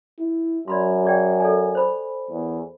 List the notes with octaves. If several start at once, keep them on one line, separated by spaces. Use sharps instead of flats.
E4
F#2 D5 B5 C6
G#4 D5 G5
A4 D5 G#5
C5 B5
E2